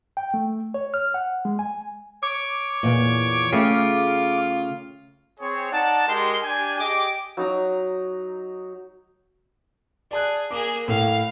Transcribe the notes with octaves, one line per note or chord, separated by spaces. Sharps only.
G5
A3
C#5
F6
F#5
G#3
G#5
C#5 D6
E2 A#2
C#3 A3 F4 G#4 G5
C4 G#4 C#5
D#4 D5 F#5 A5
G#3 G4 A#4 D#5 C6
D4 G4 G#5
G4 G#4 D#5 D6
F#3 D#4 A#5
G#4 D5 A5 F#6
A#3 G#4 D6
A2 F5